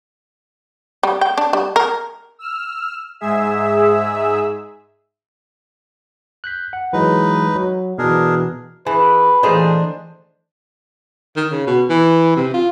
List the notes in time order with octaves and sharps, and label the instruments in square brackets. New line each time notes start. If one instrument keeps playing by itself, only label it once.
[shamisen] G3
G5
D4
G3
A#4
[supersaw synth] E6 F6
G#2 G#4 E5 E6
[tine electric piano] F#6 G6 B6
F#5
[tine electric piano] E3 F#3 G#3 [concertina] D#4 B4
[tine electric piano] F#3
[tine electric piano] B2 E3 [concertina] D4 G#4 A#4
[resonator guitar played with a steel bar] E3 [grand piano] G#4 [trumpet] B4
[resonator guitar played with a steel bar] A#2 G3 G#4 [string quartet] E3 D4 [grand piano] A3 C5 D#5
[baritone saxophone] D#3
C#3
B2
E3
C3
F4